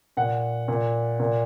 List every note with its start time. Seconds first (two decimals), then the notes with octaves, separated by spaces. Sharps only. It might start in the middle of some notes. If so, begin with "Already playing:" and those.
0.17 A#2 F#5
0.68 A#2
1.20 A#2